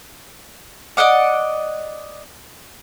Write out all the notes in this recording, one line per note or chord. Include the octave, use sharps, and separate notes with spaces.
D5 D#5 F#5 D6